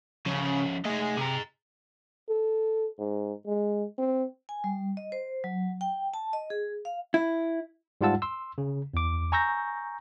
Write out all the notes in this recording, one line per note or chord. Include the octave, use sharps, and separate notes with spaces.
C#3 F3 C#4
A3 D#4 G#4 D#5
C3 G#4 A#5
A4
G#2
G#3
C4
G#5
G3
D#5
C5
F#3
G5
A5
D#5
G#4
F5
E4
G#2 G3 F4 F#5 A5 E6
C6 E6
C#3
E2 D6
G#5 A#5 C#6 E6 G6 A#6